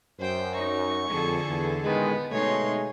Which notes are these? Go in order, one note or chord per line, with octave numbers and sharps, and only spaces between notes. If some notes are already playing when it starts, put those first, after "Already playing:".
F#2 C5 G5
D#4 C#6
F2 D3 G#4 A4
E2
A1 D#3 G#3 B3
B2 G#3 A3 D#4 G#4 C#5 C6